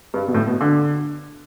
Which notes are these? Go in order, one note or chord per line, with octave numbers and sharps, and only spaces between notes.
G2
B2
A2
B2
D3